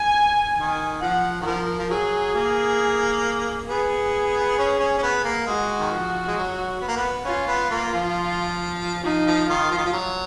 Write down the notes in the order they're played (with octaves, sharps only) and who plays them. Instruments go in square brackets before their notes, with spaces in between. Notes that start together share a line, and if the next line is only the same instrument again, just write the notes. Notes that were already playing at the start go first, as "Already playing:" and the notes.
Already playing: [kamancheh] G#5
[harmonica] D#3
[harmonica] F3 [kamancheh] F#5
[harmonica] D#3
[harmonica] F3 [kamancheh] A#4
[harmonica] F3
[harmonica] F#3 [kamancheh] G#4
[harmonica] A#3
[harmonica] B3 [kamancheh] G#4
[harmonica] C#4
C#4
C#4
B3
A#3
[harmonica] G#3 [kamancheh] F#4
[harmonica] D#3
F3
G#3
F#3
B3
A#3
B3
[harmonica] C#4 [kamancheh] F4
[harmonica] B3
A#3
F3
[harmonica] F3 [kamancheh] D#4
[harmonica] F3
[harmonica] D#3 [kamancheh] F4
[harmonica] F3
D#3
F3
F#3